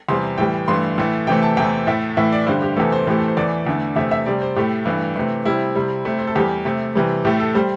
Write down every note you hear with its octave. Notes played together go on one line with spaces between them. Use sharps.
E2 C3 G3 C6
A2 E3 G3 G5
G2 E3 A3 C6
A2 E3 A3
C3 E3 A3 G5
A5
E2 C3 E3 A3 G5
A2 A3 E5
A2 E3 A3 E5
D5
G2 D3 G3 C5
G4
E2 C3 E3 A3 A4
C5
A2 E3 A3 G4
A4
C5
E2 E3 A3 D5
E2 D3 A3
E2 C3 A3 E5
E5
C3 G3 D5
C5
A2 A3 G4
G2 E3 A3
C3 E3 A3
C3 G3 E4
C3 G3
C3 A3
C5
A4
E2 E3 G3 G4
C3 A3
C3 E3 G3
A2 A3 G4
A4
G3 C5